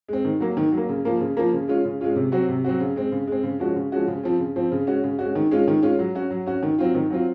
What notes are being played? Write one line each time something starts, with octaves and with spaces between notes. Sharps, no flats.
G#3 C4
D#3
F#3 A#3
D#3
F#3
A#3
C#3
F3 A#3
C#3
F3 A#3
C#3
G#3 C#4 F4
C#3
G#3 C#4 F4
C3
F#3 C4 F#4
C3
F#3 C4 F#4
C#3
G#3 C4
C#3
G#3 C4
C#3
F3 G#3 C#4 F#4
C#3
F3 G#3 C#4 F#4
C#3
F3 C4
C#3
F3 C4
C#3
G#3 C#4 F#4
C#3
G#3 C#4 F#4
D#3
G#3 C#4 F4
D#3
G#3 C#4 F4
F#3
C#4 F#4
F#3
C#4 F#4
D#3
F#3 C4 F4
D#3
F#3 C4 F4